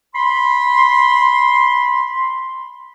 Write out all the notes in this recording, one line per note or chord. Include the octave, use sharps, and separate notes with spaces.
B5 C6